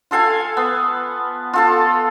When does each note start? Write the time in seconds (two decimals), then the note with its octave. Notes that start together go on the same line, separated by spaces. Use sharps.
0.11 F4 A4 F5 G#5
0.57 B3
1.53 F4 A4 A5